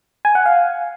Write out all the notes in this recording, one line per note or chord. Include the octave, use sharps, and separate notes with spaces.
G#5
F#5
F5